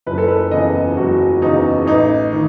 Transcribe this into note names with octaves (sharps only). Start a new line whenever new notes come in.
F#1 B4
A4
B4
E2 C#3 D#5
F#1 F#4
E2 C#3 D#4
A1 D#4
D#3